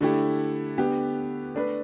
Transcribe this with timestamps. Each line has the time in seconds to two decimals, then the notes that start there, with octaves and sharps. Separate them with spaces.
0.01 D3 A3 E4 G4
0.78 D3 B3 G4
1.55 A3 D4 B4